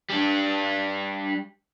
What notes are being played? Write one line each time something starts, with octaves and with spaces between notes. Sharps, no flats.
G3 D4